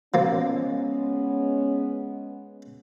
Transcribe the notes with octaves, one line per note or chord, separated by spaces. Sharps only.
F3 G#3 A#3 B3 C#4